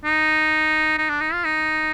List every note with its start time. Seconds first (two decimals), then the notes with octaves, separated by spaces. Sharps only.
0.05 D#4
0.99 D#4
1.10 D4
1.21 D#4
1.33 F4
1.45 D#4